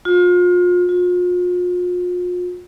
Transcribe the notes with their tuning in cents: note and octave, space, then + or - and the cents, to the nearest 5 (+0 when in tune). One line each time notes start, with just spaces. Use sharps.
F4 +35
F4 +40